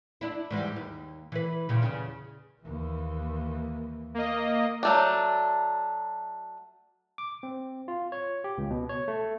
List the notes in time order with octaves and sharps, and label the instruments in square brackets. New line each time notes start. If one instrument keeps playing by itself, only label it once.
[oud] D4 E4
G#2 E3 G3
D#2
E3 B4
A#2 C#3
E2 C#3
[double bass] D#2 E3
[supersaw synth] A#3 D#5
[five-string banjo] F#3 A3 D4
[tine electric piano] D6
C4
F4
C#5
G4
C#2
B2
C#5
A3